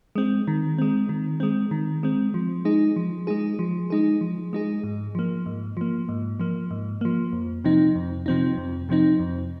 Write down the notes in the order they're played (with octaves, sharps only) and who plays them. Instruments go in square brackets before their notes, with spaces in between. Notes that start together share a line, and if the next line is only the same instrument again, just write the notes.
[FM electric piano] G#3 C4
D#3
G#3 C4
D#3
G#3 C4
D#3
G#3 C4
F3
G#3 D#4 G#4
F3
G#3 D#4 G#4
F3
G#3 D#4 G#4
F3
G#3 D#4 G#4
G#2
F3 A#3
G#2
F3 A#3
G#2
F3 A#3
G#2
F3 A#3
F2
C3 F3 C4 D#4
F2
C3 F3 C4 D#4
F2
C3 F3 C4 D#4
F2